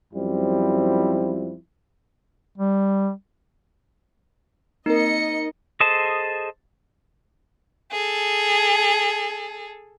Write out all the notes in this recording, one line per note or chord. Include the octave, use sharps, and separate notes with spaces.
F#2 F3 G3 C4 E4
G3
A#3 C4 D#4 A#4 D#5 C#7
G#4 A4 C5 D#5 A5
G#4 A4